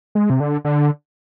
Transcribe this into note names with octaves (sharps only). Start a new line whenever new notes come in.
G#3
C3
D3
D3